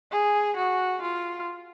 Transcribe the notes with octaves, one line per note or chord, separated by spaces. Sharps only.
G#4
F#4
F4